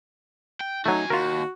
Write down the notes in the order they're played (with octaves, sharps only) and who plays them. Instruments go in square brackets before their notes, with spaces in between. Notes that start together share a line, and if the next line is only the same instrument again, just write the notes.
[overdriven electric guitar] G5
[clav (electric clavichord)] F#3 A3 [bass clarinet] D#4 [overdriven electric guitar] F#4 G#5
[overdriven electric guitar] D#2 [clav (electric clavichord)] F4 A#4 [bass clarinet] F#4